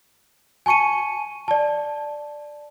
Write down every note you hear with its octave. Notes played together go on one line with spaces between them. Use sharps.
G#5 A5 C#6 C#7 D#7
D5 A5